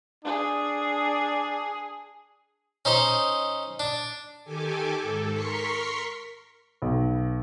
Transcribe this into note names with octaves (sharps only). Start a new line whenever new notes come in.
D4 G#4
C#4 D#4 C5 D#5
D4
D#3 G4 A4 G#5 D6
G#2 A4
A#4 C6 C#6 B6 C#7
B1